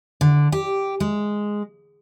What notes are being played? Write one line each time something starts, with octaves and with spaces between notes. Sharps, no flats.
D3
G4
G#3